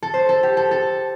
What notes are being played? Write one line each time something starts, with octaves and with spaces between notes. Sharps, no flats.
A4
C5
A4
G4
A4
A4